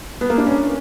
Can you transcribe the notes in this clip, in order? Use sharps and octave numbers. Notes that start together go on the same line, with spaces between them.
B3
A#3
D4
C#4